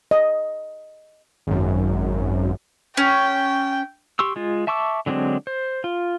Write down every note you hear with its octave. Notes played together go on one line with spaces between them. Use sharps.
D#5
G#1 F#2
C#4 G5
G4 C6 C#6 E6
G#3 F4
E5 A5 C#6 D6 E6
D3 F#3 G#3 C4 D4
C5
F4